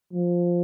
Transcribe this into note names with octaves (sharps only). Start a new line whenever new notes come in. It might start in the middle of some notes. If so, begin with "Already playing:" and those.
F3